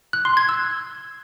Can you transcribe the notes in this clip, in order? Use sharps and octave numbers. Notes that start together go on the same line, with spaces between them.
F#6
C6
G#6
E6